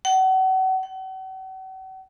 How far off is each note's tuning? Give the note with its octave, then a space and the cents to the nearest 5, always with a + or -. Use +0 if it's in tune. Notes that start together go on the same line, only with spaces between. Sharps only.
F#5 +35
F#5 +40